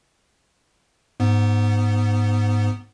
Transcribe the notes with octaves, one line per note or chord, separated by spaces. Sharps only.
G#2 B3